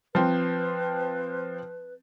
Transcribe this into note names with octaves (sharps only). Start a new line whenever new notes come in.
F3 C4 B4